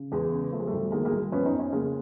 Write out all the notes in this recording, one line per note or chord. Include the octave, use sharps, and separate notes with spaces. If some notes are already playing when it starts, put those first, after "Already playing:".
Already playing: C#3
E2 G#3
C#3
F3 A3
G#3
G3 A3
D2
D#3 G#3 A#3
G#3 A#3
C2
F3 B3 C#4
C#4 D#4
F2
C#4 D#4
C#3 G#3 A#3